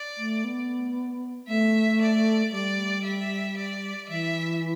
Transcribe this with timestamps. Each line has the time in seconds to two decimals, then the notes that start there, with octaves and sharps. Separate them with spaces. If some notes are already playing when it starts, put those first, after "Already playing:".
Already playing: D5
0.18 A3
0.44 B3
1.48 A3 E5
2.01 D5
2.52 G3 D5
3.04 E5
3.57 D5
4.09 E3 E5